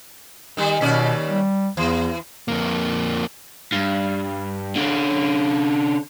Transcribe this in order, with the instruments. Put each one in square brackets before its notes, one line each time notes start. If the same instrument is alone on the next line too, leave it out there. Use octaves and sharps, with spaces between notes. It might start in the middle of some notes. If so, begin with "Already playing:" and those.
[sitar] D#3 G3
[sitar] D#2 C#4 D5 [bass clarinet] B2
[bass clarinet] G3
[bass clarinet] E2 [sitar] E3
[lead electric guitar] F2 A#3
[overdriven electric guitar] G2
D3 C#4